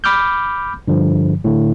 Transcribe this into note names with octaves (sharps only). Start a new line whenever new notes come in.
B5 D6 F6 G6
G2 D3 F3
A2 D3